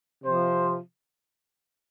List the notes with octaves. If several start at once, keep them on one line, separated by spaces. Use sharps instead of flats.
C3 F3 C5